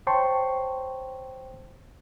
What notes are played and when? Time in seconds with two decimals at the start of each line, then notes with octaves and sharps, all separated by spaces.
0.07 C5 C#5 G5 A5 C6 C#6